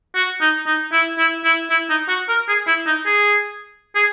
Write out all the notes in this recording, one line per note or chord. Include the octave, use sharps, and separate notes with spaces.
F#4
D#4
D#4
E4
E4
E4
E4
D#4
F#4
A#4
G#4
E4
D#4
G#4
G#4